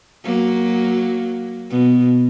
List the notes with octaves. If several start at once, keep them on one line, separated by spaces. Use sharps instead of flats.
F#3 A#3
B2